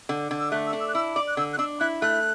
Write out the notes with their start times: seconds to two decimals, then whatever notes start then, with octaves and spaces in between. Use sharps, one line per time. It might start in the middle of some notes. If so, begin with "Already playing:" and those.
0.09 D3
0.31 D3
0.40 E6
0.51 A3 F#6
0.67 E6
0.73 D4
0.80 E6
0.89 F#6
0.95 E4 E6
1.15 D5 D6
1.28 F#6
1.37 D3 E6
1.53 F#6
1.58 D4 E6
1.80 E4 F#6
2.02 A3 F#6